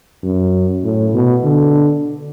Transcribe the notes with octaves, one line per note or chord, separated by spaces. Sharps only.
F#2
A2
B2
D3